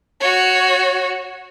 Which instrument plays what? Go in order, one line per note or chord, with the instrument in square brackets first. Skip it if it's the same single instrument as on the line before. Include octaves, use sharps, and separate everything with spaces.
[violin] F#4 C#5